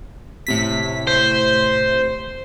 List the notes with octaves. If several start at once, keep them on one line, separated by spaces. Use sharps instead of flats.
A2 C3 B6
C5